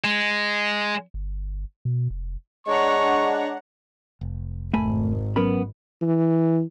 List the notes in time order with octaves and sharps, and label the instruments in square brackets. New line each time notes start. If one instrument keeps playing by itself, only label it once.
[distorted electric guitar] G#3
[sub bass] G1
B2
F1
[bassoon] G#3 [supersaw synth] D4 F#5 [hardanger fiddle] C#5 A#5 [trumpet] C#6
[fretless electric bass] F1
[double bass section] G#1 [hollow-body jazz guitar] A3 G#5 B5
[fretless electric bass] F#3 C#4 [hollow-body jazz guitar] B3 A#4 B5
[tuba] E3